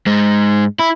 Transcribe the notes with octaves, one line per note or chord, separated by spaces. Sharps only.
G#2 G#3
E4